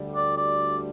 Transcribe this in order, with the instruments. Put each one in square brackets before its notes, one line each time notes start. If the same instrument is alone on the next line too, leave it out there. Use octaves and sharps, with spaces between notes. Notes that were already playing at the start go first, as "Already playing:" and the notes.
Already playing: [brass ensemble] D2 D3 G3
[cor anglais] D5
D5